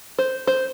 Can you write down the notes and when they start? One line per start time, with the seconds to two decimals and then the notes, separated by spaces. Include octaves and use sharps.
0.19 C5
0.47 C5